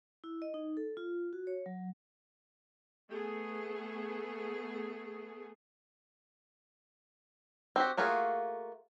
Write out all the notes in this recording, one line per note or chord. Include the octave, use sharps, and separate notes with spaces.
E4
D#5
D#4
A4
F4
F#4
C#5
F#3
A3 B3 G#4
C4 F#4 G4
A3 A#3 F4 F#4 G#4